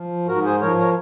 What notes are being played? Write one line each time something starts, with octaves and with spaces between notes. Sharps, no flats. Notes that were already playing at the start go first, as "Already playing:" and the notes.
Already playing: F3
G#2 F#4 A#4
G#4 C5
F3 A#4 C#5
A#4 C#5